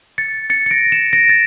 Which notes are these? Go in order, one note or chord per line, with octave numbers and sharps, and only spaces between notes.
A6 C#7
A6 C#7
C#7
A#6 D7
C#7 E7
A#6 D7
A6